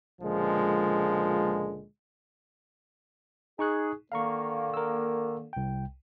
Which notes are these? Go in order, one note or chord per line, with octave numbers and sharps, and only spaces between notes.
C#2 A#2 D3 F3 G#3
D#4 G#4 C#6 F#6
D3 D#3 A#3 F5 A#5 C#6
A#4 E6
C2 G5